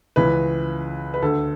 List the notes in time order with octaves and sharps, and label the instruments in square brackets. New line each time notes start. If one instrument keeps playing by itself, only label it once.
[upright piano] C#2 C#3 E3 B4
B4
D2 D3 A4